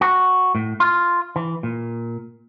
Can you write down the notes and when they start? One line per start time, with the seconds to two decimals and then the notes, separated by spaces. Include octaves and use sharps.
0.01 F#4
0.55 A2
0.80 F4
1.36 E3
1.63 A#2